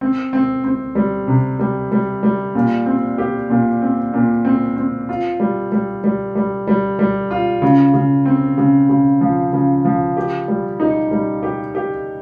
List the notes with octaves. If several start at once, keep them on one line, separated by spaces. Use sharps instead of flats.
C4
C4
C4
G3
C3
G3
G3
G3
A#2
C4
G4
A#2
C4
A#2
C4
C4
F4
G3
G3
G3
G3
G3
G3
F4
C#3
C#3
C4
C#3
C#3
F3
C#3
F3
G4
G3
D#4
G3
G4
G4